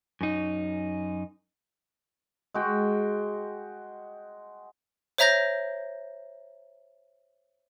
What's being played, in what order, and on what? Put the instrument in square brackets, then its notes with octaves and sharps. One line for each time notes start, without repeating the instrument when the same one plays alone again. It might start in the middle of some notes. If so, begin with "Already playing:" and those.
[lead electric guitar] F#2 D#4
[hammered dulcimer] G#3 F#4 G5
[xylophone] C5 C#5 E5 A#5 G6 A#6